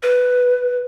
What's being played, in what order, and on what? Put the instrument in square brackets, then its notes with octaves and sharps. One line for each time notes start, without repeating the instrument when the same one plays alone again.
[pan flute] B4